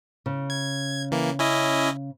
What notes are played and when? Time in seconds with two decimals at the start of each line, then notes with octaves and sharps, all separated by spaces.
0.26 C#3
0.50 G#6
1.11 E3 A#3
1.39 C#4 E4 D#5